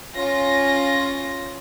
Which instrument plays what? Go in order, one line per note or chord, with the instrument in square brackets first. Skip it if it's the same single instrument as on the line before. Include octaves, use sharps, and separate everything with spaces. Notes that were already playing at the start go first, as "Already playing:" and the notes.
[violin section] C#4 F4 A#6